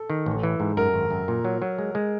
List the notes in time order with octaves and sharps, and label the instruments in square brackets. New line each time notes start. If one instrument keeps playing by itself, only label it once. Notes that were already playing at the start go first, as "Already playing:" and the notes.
Already playing: [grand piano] A4
[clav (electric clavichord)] D#3
A1
E3
G#2
[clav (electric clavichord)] F#2 [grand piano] A#4
[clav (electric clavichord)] G#1
F#2
A#2
F#3
F#3
G#3
G#3